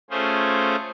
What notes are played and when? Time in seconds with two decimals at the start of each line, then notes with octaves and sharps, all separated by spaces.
0.10 A3 C#4 F4 G#4 C5